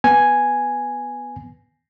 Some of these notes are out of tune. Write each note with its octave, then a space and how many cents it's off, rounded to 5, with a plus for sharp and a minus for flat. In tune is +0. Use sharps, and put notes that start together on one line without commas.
B3 +0 G#5 +0